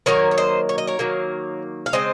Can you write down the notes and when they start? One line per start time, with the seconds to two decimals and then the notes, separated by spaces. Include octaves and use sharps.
0.06 D#3 F#3 A#3 A#4 C#5
0.31 C#5
0.38 C5 D#5
0.69 C#5
0.78 D#5
0.87 A#4 C#5
0.99 D#3 F#3 A#3
1.86 F5
1.93 C#3 G#3 C4 C5 D#5